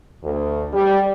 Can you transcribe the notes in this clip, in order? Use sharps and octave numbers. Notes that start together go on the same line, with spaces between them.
D2
G3